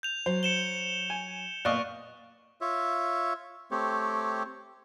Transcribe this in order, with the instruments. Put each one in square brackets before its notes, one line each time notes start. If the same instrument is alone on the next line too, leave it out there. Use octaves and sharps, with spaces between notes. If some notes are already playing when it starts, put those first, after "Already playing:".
[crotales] G6 F7
[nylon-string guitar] F#3 [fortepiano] C5
[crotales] C#7 E7 G7
[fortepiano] G#5
[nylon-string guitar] A#2 B3 [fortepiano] D5 D#5 F5 [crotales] C#6 F#6
[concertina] F4 C#5 E5
A3 C4 G4 C#5